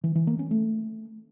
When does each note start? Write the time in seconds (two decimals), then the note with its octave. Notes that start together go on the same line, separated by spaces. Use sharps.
0.04 E3
0.15 E3
0.27 A#3
0.39 C#4
0.51 A3